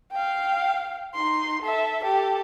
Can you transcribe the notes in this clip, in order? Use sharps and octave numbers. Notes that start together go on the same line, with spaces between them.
F5 G5
D#4 C6
A4 E5
G4 A4